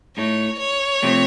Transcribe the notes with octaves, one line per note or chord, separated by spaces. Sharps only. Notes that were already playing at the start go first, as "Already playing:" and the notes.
A2 A3 D#4 C#5
C#5
C3 F3 A3 C4